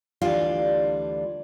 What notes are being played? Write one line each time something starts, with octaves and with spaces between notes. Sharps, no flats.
D2 E3 G3 D4 F4 F5